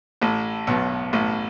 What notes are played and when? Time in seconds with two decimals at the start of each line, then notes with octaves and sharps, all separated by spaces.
0.22 A1 A2
0.67 B1 B2
1.13 A1 A2